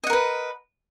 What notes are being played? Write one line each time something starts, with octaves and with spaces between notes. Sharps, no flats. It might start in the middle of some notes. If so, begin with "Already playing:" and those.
A#4 B4 D#5 F#5